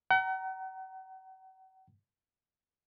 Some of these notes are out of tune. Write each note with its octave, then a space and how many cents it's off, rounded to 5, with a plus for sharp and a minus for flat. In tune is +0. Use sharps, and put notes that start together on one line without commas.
F#5 +40 A#5 +0